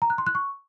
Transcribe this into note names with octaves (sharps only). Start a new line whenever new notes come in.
A#5
F#6
C6
F#6
C#6